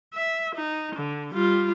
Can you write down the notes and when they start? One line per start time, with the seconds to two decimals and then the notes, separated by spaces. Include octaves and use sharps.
0.14 E5
0.55 D#4
0.95 D3
1.34 G3 F4